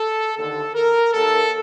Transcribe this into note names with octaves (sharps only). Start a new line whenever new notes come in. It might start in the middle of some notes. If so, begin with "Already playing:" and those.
Already playing: A4
D#2 D3 A4
A#4
D#2 D#3 A4